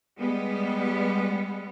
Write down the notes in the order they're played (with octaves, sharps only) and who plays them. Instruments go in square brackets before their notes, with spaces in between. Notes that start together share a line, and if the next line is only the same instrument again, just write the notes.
[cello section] G3 G#3 B3